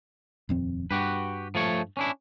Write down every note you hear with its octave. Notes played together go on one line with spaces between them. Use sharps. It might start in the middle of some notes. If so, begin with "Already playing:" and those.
D#1 F2 C4
G2 F#4 G4 B4
F3 A3 C#5
C#4 D4 E4